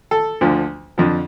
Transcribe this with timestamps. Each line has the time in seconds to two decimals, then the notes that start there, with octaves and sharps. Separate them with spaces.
0.11 A4
0.41 D2 D3 F3
0.98 F2 D3 F3